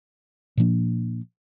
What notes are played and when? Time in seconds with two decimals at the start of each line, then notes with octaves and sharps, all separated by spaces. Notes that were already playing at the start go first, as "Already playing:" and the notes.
0.57 A#2 F3 A#3 D4